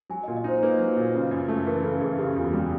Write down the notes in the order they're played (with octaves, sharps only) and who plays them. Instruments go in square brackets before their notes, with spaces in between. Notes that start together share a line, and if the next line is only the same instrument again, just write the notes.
[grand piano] F#3 [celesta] G#5
[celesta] D#5
[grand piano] A#2
[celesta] D#5
[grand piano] D#4 [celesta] C5
[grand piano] A#3 [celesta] B4
[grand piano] F#3
A#2
C#3
F#2
A3
[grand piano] E3 [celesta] A#4
[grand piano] C#3 [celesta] A4
[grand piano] F#2 [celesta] G#4
[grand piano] C#3 [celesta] G4
[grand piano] E2 [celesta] F4
[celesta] F#4
[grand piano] G3